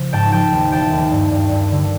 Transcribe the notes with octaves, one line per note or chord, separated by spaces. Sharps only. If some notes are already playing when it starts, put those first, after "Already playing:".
Already playing: C#3 F3
G#2 G5 A5
F3 G5 A5
D#2
E1 G5 A5
D#2
G2
G2
G2
D3